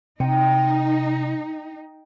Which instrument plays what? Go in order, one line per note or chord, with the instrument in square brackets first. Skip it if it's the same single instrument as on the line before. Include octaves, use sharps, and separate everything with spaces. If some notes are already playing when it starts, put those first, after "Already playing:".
[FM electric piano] C3 [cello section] D#4 [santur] G5